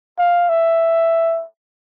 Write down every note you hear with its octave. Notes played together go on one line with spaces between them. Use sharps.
F5
E5